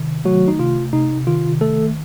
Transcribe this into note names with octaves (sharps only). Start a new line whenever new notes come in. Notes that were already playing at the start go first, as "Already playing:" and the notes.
Already playing: C3 D#3
F#3 A3 F#4
D#4
C3 F4
C3 D#4
D#3 F4
A3 A4